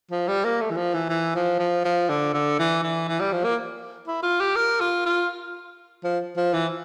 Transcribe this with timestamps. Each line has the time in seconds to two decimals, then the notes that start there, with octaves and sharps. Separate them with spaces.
0.11 F3
0.28 G3
0.45 A#3
0.61 A3
0.71 E3
0.77 F3
0.94 E3
1.10 E3
1.35 F3
1.59 F3
1.85 F3
2.09 D3
2.34 D3
2.59 E3
2.84 E3
3.09 E3
3.20 G3
3.32 F3
3.44 A#3
4.07 E4
4.23 F4
4.40 G4
4.56 A#4
4.80 F4
5.06 F4
6.04 F3
6.37 F3
6.54 E3